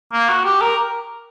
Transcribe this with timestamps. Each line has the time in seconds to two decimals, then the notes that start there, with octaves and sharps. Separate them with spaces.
0.13 A#3
0.29 F#4
0.45 G4
0.61 A#4